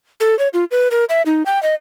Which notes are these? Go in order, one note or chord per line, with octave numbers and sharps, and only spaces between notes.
A4
C#5
F4
B4
A#4
E5
D#4
G5
D#5